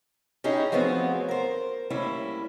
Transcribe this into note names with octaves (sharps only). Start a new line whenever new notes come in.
C#4 D#4 E4 G4 G#4
F3 F#3 A3 B3 C4 G#4
A#4 C5
G3 A3 A#3 C#4 E4